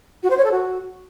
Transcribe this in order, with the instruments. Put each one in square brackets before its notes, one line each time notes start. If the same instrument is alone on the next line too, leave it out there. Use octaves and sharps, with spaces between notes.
[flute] F#4
C5
C#5
A4
F#4